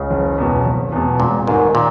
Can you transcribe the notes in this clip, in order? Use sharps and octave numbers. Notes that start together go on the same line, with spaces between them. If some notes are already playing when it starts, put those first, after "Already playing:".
Already playing: C#2 C#3
F#1
E2 B2
F#1
E2 B2
E1 A#2
D#2 G#2 D#3 A#3
A#2